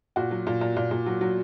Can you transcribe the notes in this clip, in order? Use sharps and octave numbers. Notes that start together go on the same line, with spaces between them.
A#2 F#4
F#3
A#2
A#2
A#2
A#2
F#3
F#3